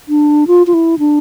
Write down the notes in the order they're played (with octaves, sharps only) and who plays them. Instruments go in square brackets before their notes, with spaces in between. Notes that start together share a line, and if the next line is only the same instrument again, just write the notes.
[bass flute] D4
F4
F4
E4
D4